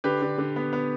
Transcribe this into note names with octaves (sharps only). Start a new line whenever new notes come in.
D3 G4 B4
D3
D3
B3
B3